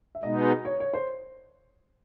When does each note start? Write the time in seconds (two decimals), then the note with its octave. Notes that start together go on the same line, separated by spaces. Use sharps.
0.15 E5
0.23 B2 G#3 B3 D#4 D#5
0.65 C#5
0.80 C#5
0.94 C5